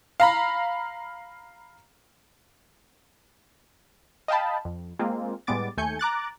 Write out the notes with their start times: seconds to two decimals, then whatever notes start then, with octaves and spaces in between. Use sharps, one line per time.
0.20 F5 A#5 B5
4.28 D#5 F5 G5 A5 B5
4.65 F2
4.99 G#3 A#3 C4 F4
5.47 A2 G3 G#3 B3 D6 A6
5.77 D#2 A3 G#5 G6 C#7
5.99 A#5 D6 F#6 A6